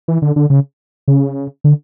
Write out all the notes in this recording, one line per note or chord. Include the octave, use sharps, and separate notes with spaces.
E3
D3
D3
C#3
C#3
D3